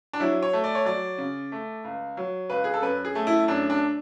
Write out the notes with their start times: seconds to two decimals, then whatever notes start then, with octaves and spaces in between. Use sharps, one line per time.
0.13 D4
0.20 F#3 E4
0.43 C#5
0.53 A3
0.64 D5
0.75 C#5
0.85 F#3 D5
1.18 C#3
1.52 A3
1.84 C#2
2.17 F#3
2.50 C#2 B4
2.64 G#4
2.74 A4
2.82 F#2 B4
3.05 G#4
3.15 A3
3.27 E4
3.48 F#2 D4
3.70 D4